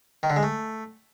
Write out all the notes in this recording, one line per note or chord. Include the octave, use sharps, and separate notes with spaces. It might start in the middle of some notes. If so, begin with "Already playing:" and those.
D#3
D3
G#3
A3